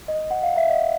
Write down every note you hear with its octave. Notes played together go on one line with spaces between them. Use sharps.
D#5
F#5
F5
E5
D#5